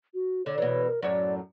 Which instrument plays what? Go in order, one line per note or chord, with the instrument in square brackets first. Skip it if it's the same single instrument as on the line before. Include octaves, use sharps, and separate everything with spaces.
[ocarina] F#4
[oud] D3 [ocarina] C#5
[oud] B2 E3 [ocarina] C#5
[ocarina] A#4
[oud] F#2 A2 C#5 [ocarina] D5